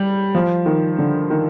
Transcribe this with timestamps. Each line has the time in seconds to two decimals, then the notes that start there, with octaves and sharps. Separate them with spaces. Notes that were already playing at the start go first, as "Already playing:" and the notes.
Already playing: G3
0.35 F3
0.66 D#3
0.98 D3
1.30 D#3